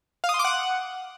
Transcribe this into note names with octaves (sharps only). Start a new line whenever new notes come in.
F5
D#6
C6
D6
F#5